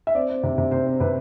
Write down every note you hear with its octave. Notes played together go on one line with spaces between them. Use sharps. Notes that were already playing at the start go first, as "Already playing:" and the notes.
E5
C4 D5
C4
C3
C3
C3 C5
C4
C3 B4